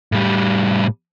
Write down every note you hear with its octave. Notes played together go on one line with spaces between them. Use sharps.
A2 G3